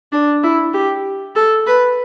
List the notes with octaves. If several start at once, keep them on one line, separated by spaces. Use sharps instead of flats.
D4
E4
G4
A4
B4